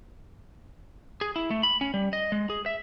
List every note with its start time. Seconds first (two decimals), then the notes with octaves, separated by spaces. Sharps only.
1.21 G#4
1.36 E4
1.51 A3
1.63 B5
1.81 C#4
1.94 G3
2.13 D#5
2.32 G#3
2.50 G#4
2.66 E5